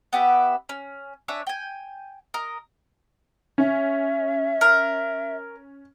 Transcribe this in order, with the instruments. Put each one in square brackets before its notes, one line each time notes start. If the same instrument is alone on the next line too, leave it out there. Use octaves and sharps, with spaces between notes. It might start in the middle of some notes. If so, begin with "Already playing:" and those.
[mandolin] B3 G4 B4 E5
C#4
D4 C#5 E5 G#5
G5 G#5
A#4 D#5
[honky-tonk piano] C#4 [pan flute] E5
[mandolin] A#4